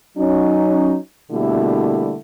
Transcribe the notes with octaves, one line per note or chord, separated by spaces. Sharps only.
F#3 C#4 D#4
B2 D3 G3 A3 A#3 E4